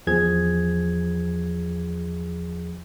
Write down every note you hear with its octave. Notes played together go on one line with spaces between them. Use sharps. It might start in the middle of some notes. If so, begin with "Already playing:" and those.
E2 F3 G#4 G#6